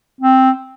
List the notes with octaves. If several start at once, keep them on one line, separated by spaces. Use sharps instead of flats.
C4